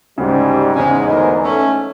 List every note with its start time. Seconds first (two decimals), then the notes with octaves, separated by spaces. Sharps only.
0.18 D2 G#2 C#3 G3
0.76 E2 G#2 C#3 G#3 C#4
1.08 D2 B3 D#4 A#4
1.44 A3 C#4